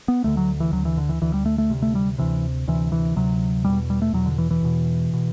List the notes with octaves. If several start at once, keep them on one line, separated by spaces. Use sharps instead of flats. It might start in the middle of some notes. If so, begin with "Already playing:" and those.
B3
D2 D3 A3
F#3
E3
D2 D3 F#3
E3
D3
E3
D2 D3 E3
G3
A3
A3
D2 C3
A3
G3
D2 C3 E3
D2 C3 E3
E3
D2 C3 F#3
E2 B2 G3
G3
A3
E2 B2 F#3
D3
E3
E3
E2 B2
B2